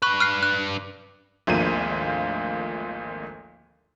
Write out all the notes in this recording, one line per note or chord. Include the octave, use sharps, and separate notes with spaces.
D4 B4 C#6 F#6
F6 F#6 C7
F#6
G#1 D2 F3 A#3 D#7